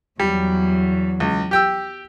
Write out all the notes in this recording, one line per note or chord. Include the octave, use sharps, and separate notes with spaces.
E2 F#3 G3
C#2
G4 G5 E6